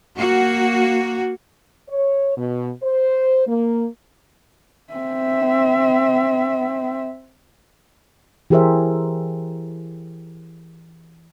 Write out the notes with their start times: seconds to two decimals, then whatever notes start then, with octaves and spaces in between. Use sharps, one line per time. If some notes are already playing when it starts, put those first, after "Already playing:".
0.17 A#3 F#4
1.89 C#5
2.37 B2
2.82 C5
3.47 A#3
4.93 C4 E5
8.50 E3 G4 G#4 A#4 C5 E5